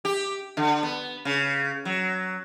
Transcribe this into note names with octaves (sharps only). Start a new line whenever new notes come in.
G4
D3
B3
C#3
F#3